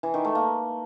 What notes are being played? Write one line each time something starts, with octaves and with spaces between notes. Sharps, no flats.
E3
D#3
A3
A#3